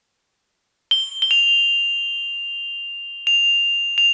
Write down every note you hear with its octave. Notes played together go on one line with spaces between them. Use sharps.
G7
G7
F7
F7
F7